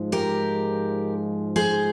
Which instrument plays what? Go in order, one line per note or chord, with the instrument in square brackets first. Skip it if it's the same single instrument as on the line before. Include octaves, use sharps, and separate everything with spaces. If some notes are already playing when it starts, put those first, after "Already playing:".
Already playing: [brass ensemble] G#2 F3 G#3
[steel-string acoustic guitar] G4 A#4
G#4 C5